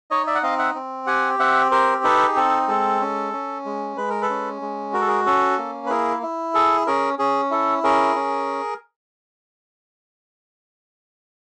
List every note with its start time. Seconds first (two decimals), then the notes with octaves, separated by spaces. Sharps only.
0.11 D#4 C#5 D#5
0.27 D5 E5
0.35 F#5
0.43 C4 D#5 F5
0.59 E5 F#5
0.75 C4
1.07 G4 F#5 G#5
1.39 C4 E5 F#5
1.71 G4 A#4 C5
2.04 D#4 A4 B4
2.28 G#4
2.36 C4 A4
2.68 G#3 A4
3.00 C#4
3.33 C#4
3.65 G#3
3.97 G#3 B4
4.10 A#4
4.22 A4 B4
4.30 C#4
4.62 G#3
4.93 F#4 A#4
5.01 A4
5.08 G#4 A#4
5.26 C#4 A4
5.58 A#3
5.86 B4
5.90 E4 G#4 A#4
6.23 E4
6.54 G#4 A4
6.87 C#4 G#4 A#4
7.19 C#4 G#4
7.51 E4 A4
7.83 C#4 G#4 A#4
8.16 C#4